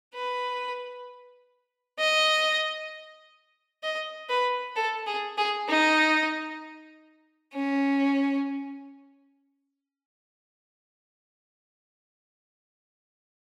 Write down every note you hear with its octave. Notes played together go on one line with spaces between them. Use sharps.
B4
D#5
D#5
B4
A4
G#4
G#4
D#4
C#4